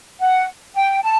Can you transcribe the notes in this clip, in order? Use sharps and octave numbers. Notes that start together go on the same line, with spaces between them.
F#5
G5
A5